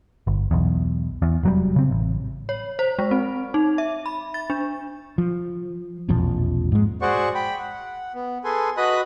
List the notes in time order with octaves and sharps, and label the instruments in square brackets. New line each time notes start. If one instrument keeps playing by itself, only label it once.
[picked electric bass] G1
B1 E2
E2
F1 F#3 G3
C#3 C4
A1
[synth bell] C#5
C5
G#3
C4
D#4
E5
B5
A6
D4
[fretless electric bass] F3
E1 A#1 F2 F3
G#2 G#3
[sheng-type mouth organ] F#4 G#4 C5 D5 F#5 C#6
G5 B5
F#5
B3
G#4 A4 B4 G#5 C6
F#4 B4 D#5 B5 D#6 F#6